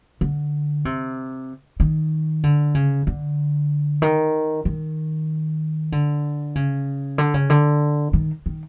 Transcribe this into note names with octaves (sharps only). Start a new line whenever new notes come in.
D3
C3
D#3
D3
C#3
D3
D#3
D#3
D3
C#3
D3
C#3
D3
D#3
D#3